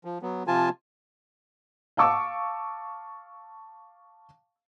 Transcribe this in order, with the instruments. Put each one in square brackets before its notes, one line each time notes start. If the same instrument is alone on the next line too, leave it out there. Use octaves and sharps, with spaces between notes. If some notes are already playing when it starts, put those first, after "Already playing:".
[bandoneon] F3
F#3 B3
C3 F3 F4 G#5 A5
[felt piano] F5 A5 C#6 D6 E6